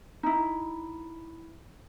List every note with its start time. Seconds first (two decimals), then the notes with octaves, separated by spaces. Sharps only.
0.23 D#4 E4